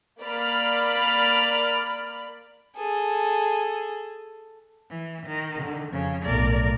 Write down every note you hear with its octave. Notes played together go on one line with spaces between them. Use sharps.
A#3 D5 B5 F6
G#4 A4
E3
D#3
D3
F2 C#3
B1 A2 A3 A#4 D5